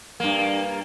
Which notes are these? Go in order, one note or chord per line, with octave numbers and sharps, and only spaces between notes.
G2 A#3